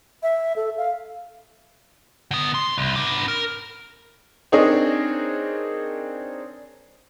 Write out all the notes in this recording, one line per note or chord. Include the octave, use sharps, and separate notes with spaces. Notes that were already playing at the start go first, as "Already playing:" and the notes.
E5
A4
F5
D3 B3
F#2 C6
C2
B3 D4
A#4
C4 D4 D#4 G#4 A#4 C#5